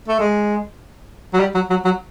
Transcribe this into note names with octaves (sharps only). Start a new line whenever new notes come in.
A3
G#3
F#3
G3
F#3
F#3
F#3